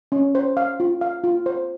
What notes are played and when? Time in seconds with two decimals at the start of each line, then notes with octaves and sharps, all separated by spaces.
0.12 C#4
0.35 C5
0.57 F5
0.80 F4
1.01 F5
1.24 F4
1.46 C5